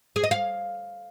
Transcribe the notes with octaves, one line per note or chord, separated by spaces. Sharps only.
G#4
D#5
F5